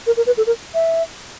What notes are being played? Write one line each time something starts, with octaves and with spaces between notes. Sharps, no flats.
A#4
A#4
B4
A4
A#4
E5